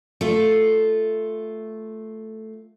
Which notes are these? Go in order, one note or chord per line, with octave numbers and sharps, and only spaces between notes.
A3 F4